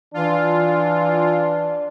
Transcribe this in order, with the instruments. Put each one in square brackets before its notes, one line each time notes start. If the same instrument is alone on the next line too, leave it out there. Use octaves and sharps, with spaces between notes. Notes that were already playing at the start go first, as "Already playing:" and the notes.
[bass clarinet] E3 [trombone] D4 [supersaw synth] F4